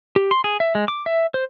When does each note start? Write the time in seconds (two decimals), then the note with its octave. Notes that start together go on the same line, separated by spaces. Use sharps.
0.16 G4
0.31 C6
0.44 G#4
0.60 E5
0.75 G#3
0.88 D6
1.06 E5
1.34 C5